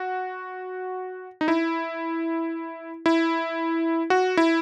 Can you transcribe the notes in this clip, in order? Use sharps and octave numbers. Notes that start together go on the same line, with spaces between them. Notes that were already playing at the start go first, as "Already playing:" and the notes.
Already playing: F#4
D#4
E4
E4
F#4
E4